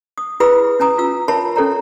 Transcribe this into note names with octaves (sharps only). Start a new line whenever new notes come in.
D#6
E4 G#4 B4 B5 D#6 E6
C#4 G#5 A#5 D#6
F4 E6
A#4 C#5 E5 A5 B5
C#4 A4 C#5 A#5